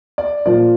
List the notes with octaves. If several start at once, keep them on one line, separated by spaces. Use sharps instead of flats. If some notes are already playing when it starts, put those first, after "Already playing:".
D5
A#2 F3 D5